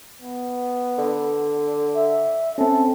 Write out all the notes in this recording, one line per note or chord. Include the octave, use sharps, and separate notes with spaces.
B3
D3
E5
C4 C#4 A4